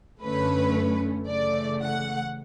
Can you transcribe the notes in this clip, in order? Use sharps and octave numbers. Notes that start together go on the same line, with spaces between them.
F#2 D3 A3 C#4 B4
C#3 E3 A3 D5
F#5